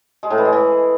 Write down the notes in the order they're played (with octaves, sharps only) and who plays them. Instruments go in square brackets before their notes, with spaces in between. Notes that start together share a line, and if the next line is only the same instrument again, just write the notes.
[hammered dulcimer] G#3
A2
E3
G#3
E3